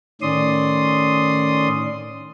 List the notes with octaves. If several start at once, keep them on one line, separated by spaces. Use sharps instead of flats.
A2 D#3 C#4 D5 C6 D#6